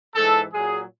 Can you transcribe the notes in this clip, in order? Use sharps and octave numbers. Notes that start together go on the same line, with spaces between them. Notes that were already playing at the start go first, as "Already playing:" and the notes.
G#2 E3 A4
A#2 F#3 G#4